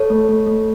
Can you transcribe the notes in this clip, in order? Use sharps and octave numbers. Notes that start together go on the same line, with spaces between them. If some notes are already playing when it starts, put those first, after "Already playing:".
Already playing: A4 C#5
A3
A3
A3